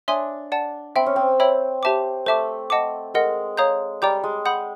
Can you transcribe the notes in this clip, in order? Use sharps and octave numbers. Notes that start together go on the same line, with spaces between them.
D4 C#5 E5 G#5 C6 D#6
D5 F#5 A5
C4 E5 G5 B5
C#4
C4
C#5 E5 G5 B5 E6
G4 C5 E5 A5 D6
A3 C5 E5 A5 D6
D#5 F#5 A5 D6
G#3 A#4 D#5 F#5
C#5 F5 A#5 D#6 G6
G3 D5 G5 A#5 D6 G6
G#3
F#5 B5 D#6 G6